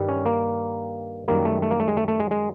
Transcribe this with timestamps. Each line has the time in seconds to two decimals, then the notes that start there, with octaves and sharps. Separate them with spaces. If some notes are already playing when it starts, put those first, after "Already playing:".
Already playing: G2 D#3 G3
0.09 C#4
0.26 A#3
1.28 F#2 D#3 G3 A#3
1.45 A3
1.62 A3
1.71 A#3
1.80 A3
1.88 G#3
1.97 A3
2.08 A3
2.20 G#3
2.31 G#3